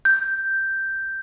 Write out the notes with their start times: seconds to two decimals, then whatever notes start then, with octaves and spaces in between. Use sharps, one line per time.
0.05 G6